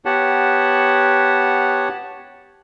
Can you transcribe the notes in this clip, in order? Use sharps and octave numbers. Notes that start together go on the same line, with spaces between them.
B3 G4 C#5 F#5 A5